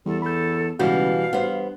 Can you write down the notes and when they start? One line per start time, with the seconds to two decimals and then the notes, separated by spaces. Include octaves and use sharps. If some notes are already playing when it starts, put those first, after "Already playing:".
0.06 E2 G3 A4
0.22 A4 B5 G6
0.79 C#2 B2 E3 G3 F#4 F5 G6
1.33 G2 B3 C5